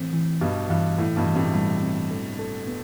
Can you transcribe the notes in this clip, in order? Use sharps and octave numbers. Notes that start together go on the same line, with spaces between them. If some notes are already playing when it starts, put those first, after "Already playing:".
Already playing: A2 E3 C4
E3
G2 B2 G4
G2 E3
A2 E4
G2 B2
E3
A2 C3
A2 G3
C4
A4
A4
B3